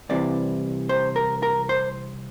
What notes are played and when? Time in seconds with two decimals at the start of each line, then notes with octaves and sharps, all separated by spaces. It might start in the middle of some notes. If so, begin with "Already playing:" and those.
0.09 C2 C3 E3 D5
0.89 C5
1.16 A#4
1.43 A#4
1.69 C5